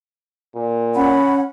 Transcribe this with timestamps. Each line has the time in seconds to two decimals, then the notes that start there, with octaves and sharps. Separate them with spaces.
0.54 A#2
0.94 C#4 F#5 B5